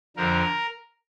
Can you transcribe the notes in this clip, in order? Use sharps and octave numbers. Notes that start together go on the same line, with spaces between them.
F2 D3 F3 A#4